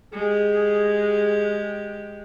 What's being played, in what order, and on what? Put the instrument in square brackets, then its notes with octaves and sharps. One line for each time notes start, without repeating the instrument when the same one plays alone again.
[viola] G#3 G4 [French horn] G#4